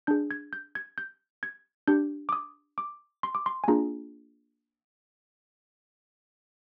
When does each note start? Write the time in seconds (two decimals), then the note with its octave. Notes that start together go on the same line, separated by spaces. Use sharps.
0.07 D4 G#4 G6
0.31 G#6
0.53 G6
0.75 G#6
0.98 G6
1.43 G#6
1.88 D4 G4 G6
2.29 D6
2.32 D#6
2.78 D6
3.23 C6
3.35 D6
3.46 C6
3.64 G#5
3.68 A#3 D4 F4 G#4 A#5